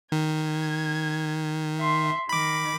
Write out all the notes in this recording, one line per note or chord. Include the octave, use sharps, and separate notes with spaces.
D#3 G#6
E5 C6
D#3 B5 D6